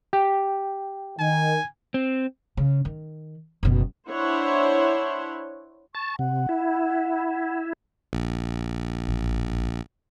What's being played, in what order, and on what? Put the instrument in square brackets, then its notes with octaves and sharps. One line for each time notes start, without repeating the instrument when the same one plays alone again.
[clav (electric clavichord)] G4 [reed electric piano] G5
[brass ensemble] D#3 [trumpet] G#5
[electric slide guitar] C4
[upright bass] C#3
D#3
F#1 B2
[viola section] D4 E4 C5 C#5 F#5
[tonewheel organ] A5 [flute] C#6
[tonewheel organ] C3 [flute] F#5
[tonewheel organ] E4
[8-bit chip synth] A#1
[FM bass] A1